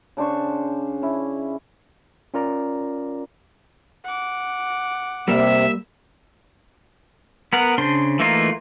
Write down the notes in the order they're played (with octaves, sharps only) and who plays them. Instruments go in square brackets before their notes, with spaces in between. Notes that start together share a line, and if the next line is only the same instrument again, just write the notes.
[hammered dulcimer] C#3 D4 C5 C#6
C#4 E4
[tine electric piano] C#4 F4 A#4 D5 A#5
[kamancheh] F#5 D6
[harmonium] C3 [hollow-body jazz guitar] G3 A#3 [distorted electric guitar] E5
[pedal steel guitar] B3 A#4 F#5
C#3 D4 C5 C6
E3 A3 A#3 D#4 F4